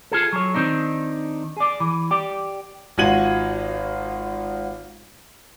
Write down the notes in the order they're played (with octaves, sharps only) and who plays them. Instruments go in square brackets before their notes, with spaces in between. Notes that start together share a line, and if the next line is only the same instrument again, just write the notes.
[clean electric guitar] F4 G#4 A4
F#3 G#4 A4 C#5
D#3 C4 D4 D#4
G#4 D5
E3
G4 D5
[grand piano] G#1 F4 F#4 G#6 D#7 F#7